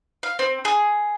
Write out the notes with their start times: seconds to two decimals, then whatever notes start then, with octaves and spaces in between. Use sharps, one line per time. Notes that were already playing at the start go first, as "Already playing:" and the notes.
0.23 F5
0.39 C4
0.65 G#4